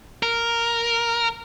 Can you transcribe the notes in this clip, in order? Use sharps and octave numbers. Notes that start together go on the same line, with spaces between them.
A#4